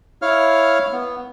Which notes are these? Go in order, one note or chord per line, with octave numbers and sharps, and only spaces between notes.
E4 C#5 F5 F6
B3